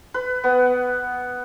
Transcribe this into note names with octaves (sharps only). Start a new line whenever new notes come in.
B4
B3